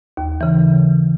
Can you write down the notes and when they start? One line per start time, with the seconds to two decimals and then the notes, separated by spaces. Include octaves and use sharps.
0.17 D#2
0.41 C#3 E3